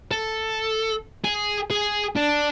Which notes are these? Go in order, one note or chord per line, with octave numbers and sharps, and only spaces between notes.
A4
G#4
G#4
D4